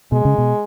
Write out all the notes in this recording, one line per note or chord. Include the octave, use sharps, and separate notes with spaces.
B2 G#3
C#3
B2